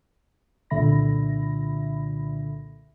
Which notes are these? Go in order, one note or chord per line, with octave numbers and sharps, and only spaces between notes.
C2 A#2 D3 E5 B5 A#6